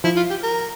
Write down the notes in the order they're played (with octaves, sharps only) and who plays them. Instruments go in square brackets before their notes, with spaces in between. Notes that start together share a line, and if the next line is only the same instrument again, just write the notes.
[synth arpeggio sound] F3 [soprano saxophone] E4
[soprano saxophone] F4
G4
A#4